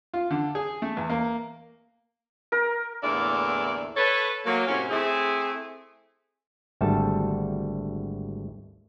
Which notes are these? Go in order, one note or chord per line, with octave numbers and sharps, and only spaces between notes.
F4
D3
G#4
A3
E2
A#3
A#4
E2 A2 D3 A#3 D5 E5
A4 B4 C#5
F#3 A#3
A2 C3 F#3 C#4
A3 C4 E4 G#4
G#1 D2 G3 A4 E5 A5